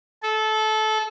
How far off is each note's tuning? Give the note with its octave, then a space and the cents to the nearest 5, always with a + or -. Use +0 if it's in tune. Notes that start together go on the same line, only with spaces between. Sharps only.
A4 -20